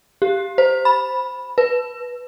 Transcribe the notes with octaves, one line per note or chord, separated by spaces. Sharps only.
G4
C5
B5
B4